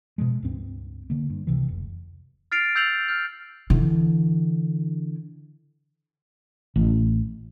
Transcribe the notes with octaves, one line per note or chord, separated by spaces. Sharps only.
B2 D3 F3 G#3
C#2 G2 C4
D3 A#3
G2
C#2 C3 E3
F1
F6 A6 C7 D7 F7
E6 G6 A6 C7 F7 F#7
F6 G6
D3 E3
A1